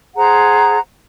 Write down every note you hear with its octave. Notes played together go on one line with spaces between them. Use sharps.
G#4 C5 F#5 A#5